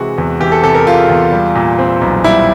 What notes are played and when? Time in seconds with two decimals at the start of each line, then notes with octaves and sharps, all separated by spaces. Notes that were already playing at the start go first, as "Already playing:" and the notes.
Already playing: C3 E3 G#3 F#4
0.18 E2
0.40 E3 G4
0.52 A4
0.63 C3 A4
0.75 A#4
0.86 G#3 F4
1.10 E2
1.32 G3
1.55 A#2
1.79 C4
2.01 B1
2.24 G3 E4